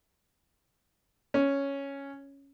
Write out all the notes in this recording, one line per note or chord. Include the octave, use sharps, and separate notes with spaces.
C#4